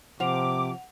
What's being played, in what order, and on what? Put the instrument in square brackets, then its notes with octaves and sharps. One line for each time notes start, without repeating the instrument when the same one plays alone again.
[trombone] C3 [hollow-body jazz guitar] F3 [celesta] F#5 F7 [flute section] D6